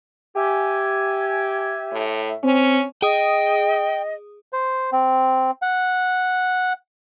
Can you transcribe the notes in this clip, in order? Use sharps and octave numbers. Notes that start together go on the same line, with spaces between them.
G4 E5 G#5
A2
C4 C#4
G#4 D#5 G5 D#6
C5
C4
F#5